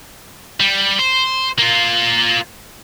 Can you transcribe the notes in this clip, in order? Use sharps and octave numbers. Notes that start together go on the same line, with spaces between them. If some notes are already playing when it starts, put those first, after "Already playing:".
G3
C5
A#3 F4